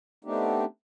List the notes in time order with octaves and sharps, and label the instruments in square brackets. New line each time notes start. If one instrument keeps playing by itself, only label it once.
[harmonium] A3 B3 C4 D4 D#4 G4